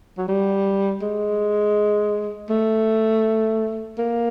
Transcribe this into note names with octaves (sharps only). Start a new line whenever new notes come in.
F#3
G3
G#3
A3
A#3